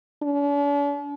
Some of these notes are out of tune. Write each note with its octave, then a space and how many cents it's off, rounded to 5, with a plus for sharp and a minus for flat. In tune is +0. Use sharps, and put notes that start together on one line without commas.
D4 -45